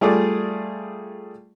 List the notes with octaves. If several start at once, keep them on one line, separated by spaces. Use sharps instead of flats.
G3 A3 F4 G#4 D5